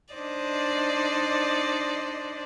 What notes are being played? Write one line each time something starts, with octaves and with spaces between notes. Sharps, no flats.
D4 D#4 C5 D5 D#5